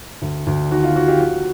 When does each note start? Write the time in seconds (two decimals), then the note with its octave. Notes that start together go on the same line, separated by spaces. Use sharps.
0.22 D2
0.47 D2
0.71 D#3 F#4
0.83 F4
0.96 D#3 F#4
1.08 F4 G4
1.20 F3 F#4